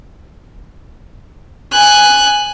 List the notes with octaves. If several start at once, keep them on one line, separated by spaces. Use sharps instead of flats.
G#5 F#6